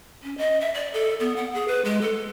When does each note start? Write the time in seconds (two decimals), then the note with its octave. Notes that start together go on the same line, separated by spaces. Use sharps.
0.23 C#4
0.38 D#5
0.61 E5
0.75 D5
0.94 A4
1.20 B3
1.36 F#5
1.54 G#4
1.68 B4
1.85 G#3
2.02 A4